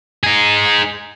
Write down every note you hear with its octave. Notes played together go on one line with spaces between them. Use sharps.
D#4 G#4